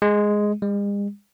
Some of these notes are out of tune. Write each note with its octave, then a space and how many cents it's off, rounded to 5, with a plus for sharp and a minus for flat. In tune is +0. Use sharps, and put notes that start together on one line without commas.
G#3 +0
G#3 -45